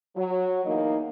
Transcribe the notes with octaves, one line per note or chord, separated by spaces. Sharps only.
F#3
E2 A#3 D#4 D#5